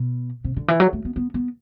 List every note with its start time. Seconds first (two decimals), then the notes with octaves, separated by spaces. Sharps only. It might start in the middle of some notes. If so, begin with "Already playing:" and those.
Already playing: B2
0.44 C3
0.56 D3
0.68 E3
0.80 F#3
0.93 A3
1.05 B3
1.16 B3
1.34 B3